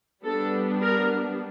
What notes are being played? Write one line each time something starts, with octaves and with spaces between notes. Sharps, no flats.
G3 B3 D4 A4
A#4